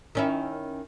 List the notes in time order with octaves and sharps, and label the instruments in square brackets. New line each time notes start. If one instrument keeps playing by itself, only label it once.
[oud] D#3 C#4 E4